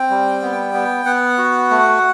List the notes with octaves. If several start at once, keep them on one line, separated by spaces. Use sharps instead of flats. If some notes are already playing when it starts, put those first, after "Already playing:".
Already playing: C4 G5
G3
B3
B3
B3 F#5
F#4
A3